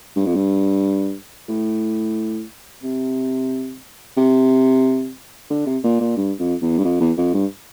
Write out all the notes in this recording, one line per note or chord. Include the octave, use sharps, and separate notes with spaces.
G2
F2
G2
A2
C3
C3
D3
C3
A#2
A#2
G2
F2
E2
G2
F2
E2
F2
G2